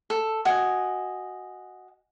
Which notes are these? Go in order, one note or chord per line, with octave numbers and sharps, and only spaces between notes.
A4
F#4 D#5 G#5